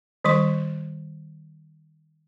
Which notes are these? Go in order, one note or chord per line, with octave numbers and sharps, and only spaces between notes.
D#3 G3 C6 C#6